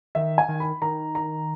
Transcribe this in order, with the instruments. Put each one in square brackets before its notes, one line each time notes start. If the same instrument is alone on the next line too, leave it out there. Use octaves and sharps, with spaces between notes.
[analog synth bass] D#3 [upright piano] E5
[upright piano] G#5
[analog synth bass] D#3
[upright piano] B5
[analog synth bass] D#3 [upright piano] A#5
[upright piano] A#5